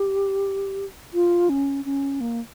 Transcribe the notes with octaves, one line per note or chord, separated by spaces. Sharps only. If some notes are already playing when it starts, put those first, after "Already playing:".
Already playing: G4
F4
C#4
C#4
A#3